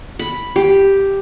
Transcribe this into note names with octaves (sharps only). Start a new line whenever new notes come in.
B5
G4